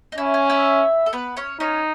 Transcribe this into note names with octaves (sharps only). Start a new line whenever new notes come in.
D#4
C#4 E4
G#4
E4 E5
A4
B3 B4
C#4 C#5
C#4 D#4 C#5